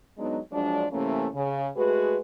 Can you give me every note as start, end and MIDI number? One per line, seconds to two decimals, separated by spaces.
0.18 0.38 54
0.18 0.38 56
0.18 0.38 59
0.18 0.38 62
0.18 0.38 63
0.51 0.85 53
0.51 0.85 54
0.51 0.85 56
0.51 0.85 62
0.92 1.27 48
0.92 1.27 52
0.92 1.27 57
0.92 1.27 58
0.92 1.27 61
1.34 1.69 49
1.77 2.17 56
1.77 2.17 57
1.77 2.17 66
1.77 2.17 68
1.77 2.17 71